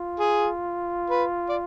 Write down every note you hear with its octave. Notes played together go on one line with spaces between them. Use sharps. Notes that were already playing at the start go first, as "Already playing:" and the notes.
Already playing: F4
G#4
B4
D5